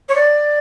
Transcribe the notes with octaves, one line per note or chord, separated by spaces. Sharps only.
C#5
D5